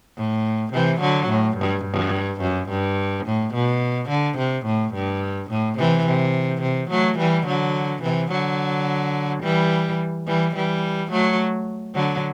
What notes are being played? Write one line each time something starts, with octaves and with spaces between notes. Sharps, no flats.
A2
C3 E3
D3 F#3
A2
G2
G2
F#2
G2
A2
B2
D3
C3
A2
G2
A2
C3 E3
C3
C3
F#3 A3
E3 G3
D3 F#3
C3 E3
D3 F#3
E3 G3
E3 G3
E3 G3
F#3 A3
D3 F#3